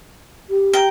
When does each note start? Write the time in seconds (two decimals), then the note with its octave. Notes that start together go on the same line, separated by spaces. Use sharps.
0.49 G4
0.73 G5 A#5